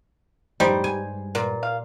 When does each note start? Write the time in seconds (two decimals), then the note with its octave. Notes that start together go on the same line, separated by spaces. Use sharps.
0.60 F#2 A2 F3 G3 D#4 C5
0.84 G2 G3 G#3 G#5
1.35 A#2
1.63 F5